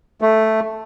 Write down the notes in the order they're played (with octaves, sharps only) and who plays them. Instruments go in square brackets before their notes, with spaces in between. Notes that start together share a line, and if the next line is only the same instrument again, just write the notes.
[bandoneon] A3